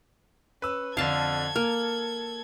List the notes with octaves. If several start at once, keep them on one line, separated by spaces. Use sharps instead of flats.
C#4 B4 E6
F2 D3 A4 F5 A5 G#6
A#3 F6